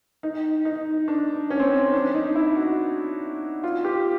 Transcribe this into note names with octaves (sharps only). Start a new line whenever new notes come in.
D#4
D#4
D4
C#4
C4
C#4
D4
D#4
E4
F#4
F4
G4